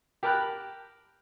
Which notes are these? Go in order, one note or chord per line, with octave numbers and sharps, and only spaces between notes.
G4 A#4 A5 B5 F#6